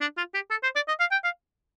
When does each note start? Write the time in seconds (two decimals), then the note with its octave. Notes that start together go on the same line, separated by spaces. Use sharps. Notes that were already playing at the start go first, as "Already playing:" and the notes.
0.01 D4
0.17 F4
0.34 G4
0.51 A4
0.63 C5
0.76 D5
0.88 D#5
1.00 F5
1.12 G5
1.24 F5